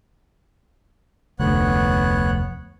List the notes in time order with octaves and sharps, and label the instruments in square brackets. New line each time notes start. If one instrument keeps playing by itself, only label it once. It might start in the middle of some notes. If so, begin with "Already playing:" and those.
[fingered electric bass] F1 D2 [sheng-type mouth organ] B3 C#5 F#6